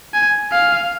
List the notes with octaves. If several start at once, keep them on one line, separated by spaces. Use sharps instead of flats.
G#5
F5